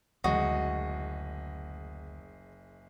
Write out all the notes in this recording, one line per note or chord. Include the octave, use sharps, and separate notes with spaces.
F#1 D2 G#3 F#4 D#5